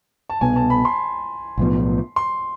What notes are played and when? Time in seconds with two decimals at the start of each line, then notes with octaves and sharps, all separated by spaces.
0.30 A5
0.41 C2 B2 B3 G#5
0.56 A5
0.70 B5
0.85 C6
1.58 B1 A2 F3 B3
2.16 C6